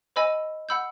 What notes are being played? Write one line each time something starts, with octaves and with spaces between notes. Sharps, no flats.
C5 D#5 G#5 B5 E6
F#5 B5 E6 G6